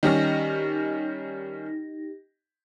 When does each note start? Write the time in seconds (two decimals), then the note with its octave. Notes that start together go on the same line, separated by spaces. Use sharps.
0.03 D#3 G3 C#4 D#4 G4 A#6